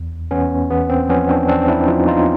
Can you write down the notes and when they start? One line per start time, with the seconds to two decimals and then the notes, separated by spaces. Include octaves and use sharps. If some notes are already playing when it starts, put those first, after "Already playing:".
Already playing: E2
0.31 E2 B3 C#4
0.70 E2 B3
0.90 C4
1.09 F3 B3 C#4
1.29 C4 D4
1.48 E2 C4 D4
1.68 D4 E4
1.88 F3 D#4 F4
2.07 D#4 F4